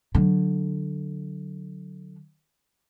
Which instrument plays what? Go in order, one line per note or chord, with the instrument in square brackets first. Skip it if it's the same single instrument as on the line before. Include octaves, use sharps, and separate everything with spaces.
[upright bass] D3 F#3